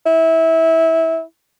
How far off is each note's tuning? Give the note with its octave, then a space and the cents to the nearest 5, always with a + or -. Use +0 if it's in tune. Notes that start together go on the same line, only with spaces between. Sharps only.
E4 -20